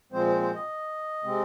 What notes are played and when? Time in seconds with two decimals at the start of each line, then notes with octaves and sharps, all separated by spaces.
0.12 A#2 F3 G#3 C4 C5
0.27 C5
0.41 C5
0.54 D#5
1.24 C3 G#3 C4